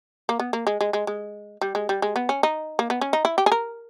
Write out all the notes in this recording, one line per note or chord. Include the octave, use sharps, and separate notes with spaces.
A#3
B3
A#3
G#3
G#3
G#3
G#3
G3
G#3
G3
G#3
B3
C#4
D#4
A#3
B3
C#4
D#4
E4
G4
G#4
A#4